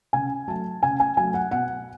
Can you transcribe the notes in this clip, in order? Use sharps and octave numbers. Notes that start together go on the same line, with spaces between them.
C#3 G#5
F#3 A3 A5
C#3 G#5
G#5
F#3 A3 G#5
F#5
B2 F#5